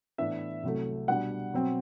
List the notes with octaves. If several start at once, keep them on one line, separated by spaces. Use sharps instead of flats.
A2 E3 B3 D4 E5
C2 C3 F#3 A3
B2 G3 D4 F#5
B2 F#3 C4